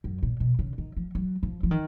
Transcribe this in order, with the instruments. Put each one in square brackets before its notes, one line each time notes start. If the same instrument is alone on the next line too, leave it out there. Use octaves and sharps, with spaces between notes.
[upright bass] F#2
A#2
B2
C#3
D#3
F3
F#3
F3
F3
D#3